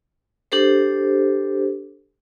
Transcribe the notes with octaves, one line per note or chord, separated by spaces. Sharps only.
D4 G4 A4 C5